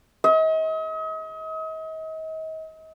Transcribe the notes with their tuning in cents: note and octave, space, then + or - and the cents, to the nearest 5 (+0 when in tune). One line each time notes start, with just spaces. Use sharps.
D#5 +40